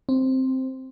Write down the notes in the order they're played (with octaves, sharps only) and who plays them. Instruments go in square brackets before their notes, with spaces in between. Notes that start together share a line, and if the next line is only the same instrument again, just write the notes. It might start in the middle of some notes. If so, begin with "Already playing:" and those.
[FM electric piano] C4